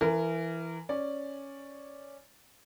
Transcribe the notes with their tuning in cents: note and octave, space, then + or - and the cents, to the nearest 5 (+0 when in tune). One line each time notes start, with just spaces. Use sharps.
E3 +10 A#4 -20
C#4 +0 D5 +0